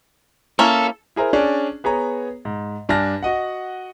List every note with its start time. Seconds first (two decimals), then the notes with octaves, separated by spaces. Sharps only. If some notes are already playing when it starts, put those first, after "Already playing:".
0.59 A#3 C#4 E4 A4
1.16 E4 G#4 A#4 C5
1.33 C#4 D4 G#4 D5
1.84 B3 G#4 C#5 A#5
2.45 G#2
2.89 G2 D4 G#5 A5 F6 A#6
3.23 F#4 D#5 F#5